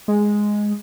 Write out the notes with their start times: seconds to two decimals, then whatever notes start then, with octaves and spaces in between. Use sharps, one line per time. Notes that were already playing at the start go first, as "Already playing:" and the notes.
0.08 G#3